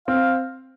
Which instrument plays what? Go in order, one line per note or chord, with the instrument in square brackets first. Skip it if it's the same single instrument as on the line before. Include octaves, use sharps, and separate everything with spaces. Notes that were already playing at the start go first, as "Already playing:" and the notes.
[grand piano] C4 [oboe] F5